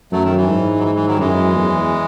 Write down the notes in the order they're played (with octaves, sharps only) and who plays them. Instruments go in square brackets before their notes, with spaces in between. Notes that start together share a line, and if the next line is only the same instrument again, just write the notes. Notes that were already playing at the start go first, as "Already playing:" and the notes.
[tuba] F#2 [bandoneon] F#3 A3
[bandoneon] D#3
E3
[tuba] G#2
[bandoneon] F#3
E3
E3
D#3 F#3
[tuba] F#2 [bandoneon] E3 G#3
[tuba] E2